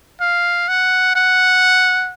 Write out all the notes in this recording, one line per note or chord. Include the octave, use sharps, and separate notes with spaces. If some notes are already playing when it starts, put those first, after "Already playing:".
F5
F#5
F#5